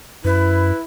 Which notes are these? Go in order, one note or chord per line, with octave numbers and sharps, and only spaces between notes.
F#2 E4 B4